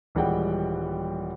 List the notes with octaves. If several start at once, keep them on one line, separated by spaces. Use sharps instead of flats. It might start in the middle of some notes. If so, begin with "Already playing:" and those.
D#1 E3 G3 G#3 F#5 G5